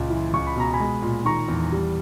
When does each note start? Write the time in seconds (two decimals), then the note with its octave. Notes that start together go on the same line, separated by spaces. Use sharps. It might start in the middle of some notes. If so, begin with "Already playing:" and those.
Already playing: C#2 A#2
0.10 E3
0.33 C#2 C#6
0.47 B5
0.56 B2 A#5
0.73 G#5 B5
0.80 G#3
1.02 A#2
1.25 D#3 A#5 C#6
1.48 E2
1.72 G3